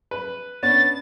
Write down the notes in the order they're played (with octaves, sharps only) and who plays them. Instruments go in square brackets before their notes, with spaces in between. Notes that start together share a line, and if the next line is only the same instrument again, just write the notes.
[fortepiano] B4
[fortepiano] B3 C#4 D4 [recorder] A6